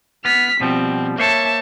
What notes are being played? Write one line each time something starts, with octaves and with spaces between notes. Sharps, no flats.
B3 F6 B6
B2 F3 G3 C4
A#3 C5 C#5 E5 A5